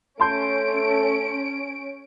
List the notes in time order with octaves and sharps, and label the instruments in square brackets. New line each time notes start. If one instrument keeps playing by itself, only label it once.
[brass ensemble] A3 A4 [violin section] C#4 D7 [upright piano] A5 C6 G6